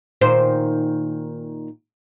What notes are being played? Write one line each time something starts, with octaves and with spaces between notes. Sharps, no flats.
A#2 D#3 C5